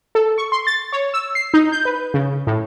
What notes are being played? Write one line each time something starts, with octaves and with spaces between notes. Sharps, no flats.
A4
C#6
C6
A6
C#5
E6
C7
D#4
G6
B4
C#3
A2